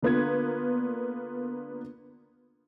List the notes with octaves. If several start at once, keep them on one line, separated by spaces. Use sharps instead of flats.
D3 A#3 B3 F4 G#6